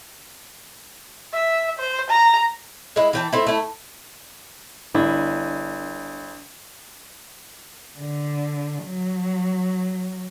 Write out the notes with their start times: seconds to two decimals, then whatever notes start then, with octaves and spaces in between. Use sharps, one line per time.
1.33 E5
1.79 C5
2.10 A#5
2.96 G#3 E4
3.13 E3 G5 A5
3.33 A3 C4 E4
3.47 A3 E4
4.95 G1 D4 E4
7.99 D3
8.85 F#3